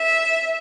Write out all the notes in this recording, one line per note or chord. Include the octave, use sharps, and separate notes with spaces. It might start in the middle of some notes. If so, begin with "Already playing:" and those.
Already playing: E5